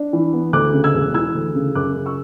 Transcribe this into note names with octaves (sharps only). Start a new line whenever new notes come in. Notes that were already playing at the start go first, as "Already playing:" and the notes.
Already playing: D4
E3
B3
D2 D6 F#6
C#3
E6 G#6
E1
E3 E6 G#6
D2
C#3
F#2 D6 F#6
C#3
C#6 E6